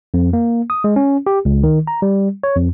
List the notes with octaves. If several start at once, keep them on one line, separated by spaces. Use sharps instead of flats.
F2
A#3
D#6
G#3
C#4
G4
C#2
D#3
A#5
G3
C#5
F2